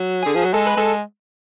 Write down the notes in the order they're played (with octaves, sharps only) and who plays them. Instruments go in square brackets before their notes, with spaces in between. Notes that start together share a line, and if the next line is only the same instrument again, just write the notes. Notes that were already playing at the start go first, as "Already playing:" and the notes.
Already playing: [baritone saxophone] F#3
[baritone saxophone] D3 [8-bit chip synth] G#4
[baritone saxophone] F3
F#3
[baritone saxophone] G#3 [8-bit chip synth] A4
[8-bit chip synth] B4
[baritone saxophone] G#3 [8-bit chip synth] A4